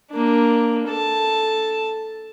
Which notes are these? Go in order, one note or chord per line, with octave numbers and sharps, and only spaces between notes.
A#3 D4
A4 A5